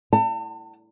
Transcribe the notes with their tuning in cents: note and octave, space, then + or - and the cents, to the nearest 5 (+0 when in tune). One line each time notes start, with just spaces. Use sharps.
F#5 +40 A5 +40